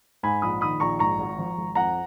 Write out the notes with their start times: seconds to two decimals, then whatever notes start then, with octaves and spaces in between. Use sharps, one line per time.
0.23 G#2 G#5 B5
0.42 A#1 B5 D#6
0.61 D#3 B5 D#6
0.80 A#1 A#5 C#6
0.99 G#2 A#5 C#6
1.18 G#1
1.39 F3
1.58 G#1
1.75 F2 F#5 A#5